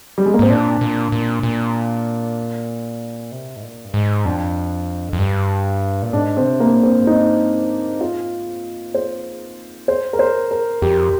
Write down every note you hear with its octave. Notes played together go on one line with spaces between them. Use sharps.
G3
G#3
A#3
G#2 C4
A#2 D4
A#2
A#2
A#2
C3
G#2
A#2
G2
G#2
F2 D4
F2
G2
A#2
G#2 D4
C4
D3
C3
A#3
A#2
C4
G2
G#2 D#4
F4
F2 C5
C5
A#4
C5
A#4
F2 G4